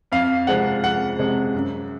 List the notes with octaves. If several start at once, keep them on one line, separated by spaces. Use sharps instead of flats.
F2 F5
C3 F3 G#3 F#5
F2 F#5
C3 F3 G#3
F#2